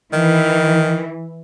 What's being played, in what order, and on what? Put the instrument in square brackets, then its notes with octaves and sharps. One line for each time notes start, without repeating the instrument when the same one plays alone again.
[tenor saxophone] D#3 [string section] E3